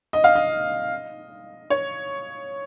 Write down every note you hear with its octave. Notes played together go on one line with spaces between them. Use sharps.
D#5
F5
D#5
C#5